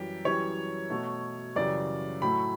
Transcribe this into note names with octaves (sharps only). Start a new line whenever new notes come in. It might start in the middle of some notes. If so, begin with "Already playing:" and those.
Already playing: F#2 E3 G3 G4
F#2 E3 G3 C#5
B2 A3
F#2 C#3 E3 G3 D5
A2 F#3 A3 B5